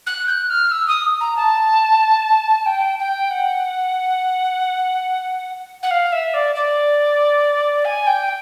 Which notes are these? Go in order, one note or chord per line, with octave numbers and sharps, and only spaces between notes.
F#6
G6
F#6
F6
E6
D#6
A#5
A5
G5
G5
F#5
F#5
F5
E5
D5
D5
G#5
G5